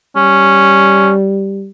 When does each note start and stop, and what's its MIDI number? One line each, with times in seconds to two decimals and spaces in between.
0.16 1.70 55
0.16 1.10 61